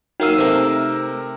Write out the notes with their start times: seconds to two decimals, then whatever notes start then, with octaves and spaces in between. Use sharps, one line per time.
0.20 F#3 A#3 D#4 F5 G5 E6 C7 D#7
0.38 C3 A3 C4 A#4